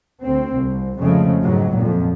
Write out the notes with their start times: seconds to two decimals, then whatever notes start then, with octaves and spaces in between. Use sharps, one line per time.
0.22 D2 C4
0.52 C2
0.99 F2 C#3 F3 G#3 A3
1.42 C#2 G#2 F#3
1.76 F2 A#2